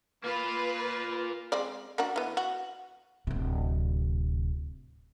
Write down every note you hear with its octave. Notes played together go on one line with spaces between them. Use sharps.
A#3 F4 B4
G#3 C4 D5
A#3 D4 F#4
E3 B3
F#4
D1 C3